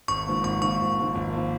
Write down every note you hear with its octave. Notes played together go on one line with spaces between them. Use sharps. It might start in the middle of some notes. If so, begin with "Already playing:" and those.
G#1 C#6
G#2 F3 A#3
G#1 C#6
G#2 F3 A#3 C#6
G#1
G#2 F3 A#3
G#1
F3 A#3